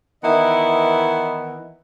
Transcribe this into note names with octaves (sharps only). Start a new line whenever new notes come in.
D#3 E3 B3 E4 D#5 F#5